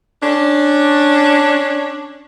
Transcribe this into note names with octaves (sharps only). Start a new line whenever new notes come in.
C#4 D4